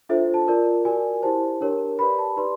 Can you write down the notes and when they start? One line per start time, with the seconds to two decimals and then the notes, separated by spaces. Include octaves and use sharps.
0.09 D4 F4 A4 C5 E5
0.34 A5
0.47 F4 A#4 D5
0.85 F#4 A#4 D5 G#5
1.22 E4 G4 C5 A5
1.61 D4 G4 A#4 C#5
1.99 G4 B4 D5 B5
2.18 A5
2.36 D#4 G4 B4 D5 C6